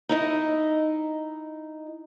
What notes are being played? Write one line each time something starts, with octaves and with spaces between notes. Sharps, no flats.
D#4 E4 D#5